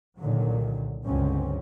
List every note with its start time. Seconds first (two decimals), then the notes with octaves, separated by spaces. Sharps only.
0.18 C2 A#2 D3 D#3 F#3
1.04 C#2 G2 D3 F#3 C4 C#4